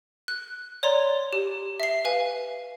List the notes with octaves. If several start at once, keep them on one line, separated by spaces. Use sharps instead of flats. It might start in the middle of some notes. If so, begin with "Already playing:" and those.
F#6
C#5 D5 A#5 C6
G4
E5 C7
B4 F5 G#5